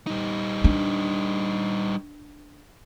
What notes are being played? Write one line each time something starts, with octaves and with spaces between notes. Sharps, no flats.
G3 D#4
D4